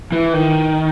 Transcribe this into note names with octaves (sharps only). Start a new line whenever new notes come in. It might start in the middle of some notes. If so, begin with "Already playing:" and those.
E3
D#3